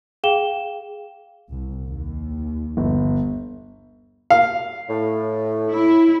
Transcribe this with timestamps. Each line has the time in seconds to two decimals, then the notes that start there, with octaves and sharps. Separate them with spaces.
0.24 G#4 F5 G5 E7 G7
1.50 C2
1.86 D#2
2.77 G1
4.30 F5
4.89 A2
5.71 E4